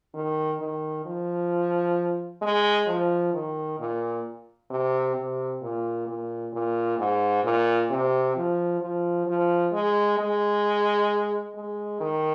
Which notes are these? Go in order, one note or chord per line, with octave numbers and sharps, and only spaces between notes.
D#3
D#3
F3
G#3
F3
D#3
A#2
C3
C3
A#2
A#2
A#2
G#2
A#2
C3
F3
F3
F3
G#3
G#3
G#3
D#3